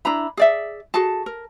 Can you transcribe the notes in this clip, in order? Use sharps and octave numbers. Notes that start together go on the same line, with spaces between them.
D4 E4 A#5 B5
G#4 D5 E5
F#4 G#4 A4 A5
A#4